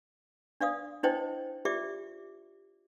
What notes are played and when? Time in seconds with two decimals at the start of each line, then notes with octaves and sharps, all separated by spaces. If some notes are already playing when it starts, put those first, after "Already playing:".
0.61 D4 D5 F5 D#6
1.03 D4 E4 C5 C#5 D#5 G5
1.65 F4 G4 D5 E5 D6